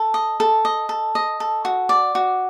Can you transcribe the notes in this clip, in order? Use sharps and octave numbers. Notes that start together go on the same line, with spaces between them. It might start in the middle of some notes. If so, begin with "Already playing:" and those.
Already playing: A4
D#5
A4
D#5
A4
D#5
A4
F#4
D5
F#4